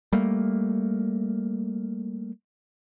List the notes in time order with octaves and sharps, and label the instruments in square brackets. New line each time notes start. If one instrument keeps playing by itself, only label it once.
[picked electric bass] G3 A3 A#3